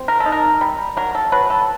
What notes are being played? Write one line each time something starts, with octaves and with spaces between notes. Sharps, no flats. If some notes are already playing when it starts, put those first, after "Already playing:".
Already playing: C4
A#4
A4
D#4
A#4
G3
F#3 A#4
A4
F#3 B4
A4